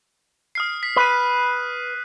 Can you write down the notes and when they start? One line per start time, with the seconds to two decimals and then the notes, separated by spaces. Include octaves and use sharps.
0.55 D#6 F6 C7
0.83 B6
0.96 B4 D#6 F#6 D#7